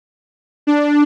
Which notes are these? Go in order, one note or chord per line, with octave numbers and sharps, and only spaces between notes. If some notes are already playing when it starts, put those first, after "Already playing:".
D4